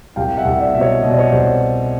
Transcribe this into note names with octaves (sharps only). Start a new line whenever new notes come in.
C2 F5 G5
E5 F#5
C2
D5 E5
B2 E5
C#5 D#5
B2 D#5
D5
C#5 D#5
C2 C5 D5